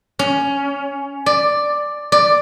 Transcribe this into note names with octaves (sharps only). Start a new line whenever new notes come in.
C#4
D5
D5